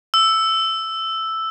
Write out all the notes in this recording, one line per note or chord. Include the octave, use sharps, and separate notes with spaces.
E6